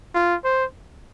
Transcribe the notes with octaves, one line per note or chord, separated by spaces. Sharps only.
F4
C5